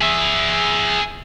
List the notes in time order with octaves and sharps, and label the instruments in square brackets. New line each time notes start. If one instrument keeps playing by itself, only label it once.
[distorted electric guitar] G#4 E5